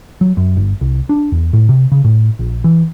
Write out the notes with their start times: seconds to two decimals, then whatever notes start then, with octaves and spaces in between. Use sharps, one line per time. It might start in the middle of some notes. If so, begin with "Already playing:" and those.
0.21 F#3
0.37 F#2
0.57 G1
0.81 C2
1.09 D4
1.32 E2
1.53 A2
1.69 C3
1.92 C#3
2.04 A2
2.39 A#1
2.64 E3